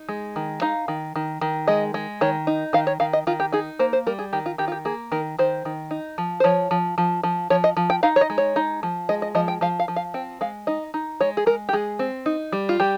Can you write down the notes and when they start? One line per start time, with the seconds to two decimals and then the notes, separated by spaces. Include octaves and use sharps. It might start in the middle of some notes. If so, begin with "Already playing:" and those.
Already playing: D#4
0.09 G#3
0.36 D#3
0.62 D#4 F5
0.88 D#3
1.16 D#3
1.41 D#3
1.68 G#3 D#5
1.94 G#3
2.21 D#3 C#5
2.47 D#4
2.73 D#3 F5
2.87 C#5
3.00 D#3 F5
3.13 D#5
3.27 D#3 F4
3.40 G4
3.52 D#4 G#4
3.79 A#3 C5
3.93 C5
4.07 G3 A#4
4.19 G#4
4.33 D#3 G4
4.46 F4
4.58 D#3 G4
4.68 F4
4.72 G4
4.85 A#3 G#4
5.12 D#3 A#4
5.39 D#3 C5
5.65 D#3
5.91 D#4
6.18 F3
6.40 C5
6.44 F3 C#5
6.71 F3
6.98 F3
7.23 F3
7.50 F3 C#5
7.64 D#5
7.77 F3
7.90 G5
8.03 D#4 F5
8.16 C#5
8.21 D#5
8.30 G#3
8.38 C#5
8.56 D#4
8.83 F3
9.09 G#3 D#5
9.22 D#5
9.35 F3 D#5
9.48 G5
9.61 F3 F5
9.80 F5
9.88 F3
9.96 F5
10.14 C4 G5
10.41 G#3 F5
10.67 D#4 D#5
10.94 D#4
11.21 G#3 C#5
11.37 G#4
11.46 G#3 A#4
11.69 G4
11.73 G#3 G#4
11.99 C4
12.26 D#4
12.52 G3
12.69 F4
12.80 G3 G4